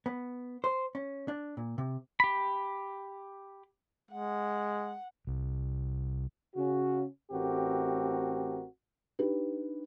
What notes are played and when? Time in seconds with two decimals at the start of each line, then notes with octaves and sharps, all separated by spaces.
0.06 B3
0.64 C5
0.95 C#4
1.28 D4
1.57 A#2
1.78 C3
2.20 G4 B5
4.11 G#3 F#5
5.27 C2
6.56 C#3 C#4 F#4
7.32 A1 A3 C4 F#4 G4 A#4
9.19 D4 D#4 G4 B4